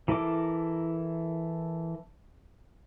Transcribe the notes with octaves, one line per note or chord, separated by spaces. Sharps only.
E3 E4 A4 A#4 D6